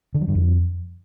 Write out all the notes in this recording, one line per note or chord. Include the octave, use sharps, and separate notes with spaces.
D3
F#3
G2
F2